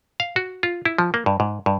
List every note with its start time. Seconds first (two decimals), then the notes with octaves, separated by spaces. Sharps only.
0.20 F5
0.36 F#4
0.63 F4
0.85 E4
0.98 F3
1.14 A#3
1.26 G2
1.40 G#2
1.66 G2